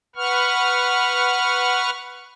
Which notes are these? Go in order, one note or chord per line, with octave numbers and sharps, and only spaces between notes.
B4 F#5 C#6 F6